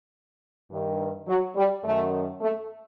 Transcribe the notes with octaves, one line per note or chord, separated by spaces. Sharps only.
G2 D#3
F#3
G3
F#2 D#3 A3
A3